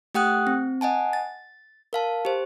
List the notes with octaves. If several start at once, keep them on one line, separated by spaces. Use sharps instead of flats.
A3 G4 F#5 G5 D#6 F#6
C4
D#5 F#5 G#5 A5
A6
A#4 F5 A5
G4 C5